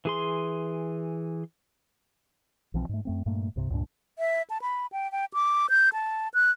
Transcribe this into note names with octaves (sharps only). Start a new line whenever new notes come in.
E3 G#4 C6
B1 E3 F3 C4
G#2 A3
F#2 A3 C4
G2 A#2 A3 A#3
C2 G2 C3
C#2 G2 A#2 D4
E5
A5
B5
G5
G5
D6
G6
A5
F#6